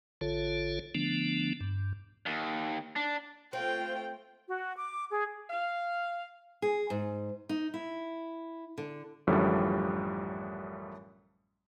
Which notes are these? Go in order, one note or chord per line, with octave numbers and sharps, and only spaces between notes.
A1 D3 F4 A4 C#5
D3 F3 A3 B3 D4
G2
D#2
D4
A3 C4 F4 C5 G5
F#4
D6
G#4
F5
G#4
G#2
D#4
E4
D3
A1 F#2 A2 D3 F3 G3